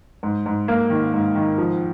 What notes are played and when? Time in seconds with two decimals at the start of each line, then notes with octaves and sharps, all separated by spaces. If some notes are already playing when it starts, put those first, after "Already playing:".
0.23 G#2
0.46 G#2
0.68 A#3
0.90 D#3
1.14 G#2
1.35 D#3
1.58 F3